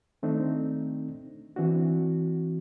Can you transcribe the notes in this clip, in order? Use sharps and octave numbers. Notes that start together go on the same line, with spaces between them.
D#3 A3 C4 D4 D#4
E3 C4 D4 F#4